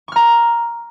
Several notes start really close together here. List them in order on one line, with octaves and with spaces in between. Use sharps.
C#6 F6 A#5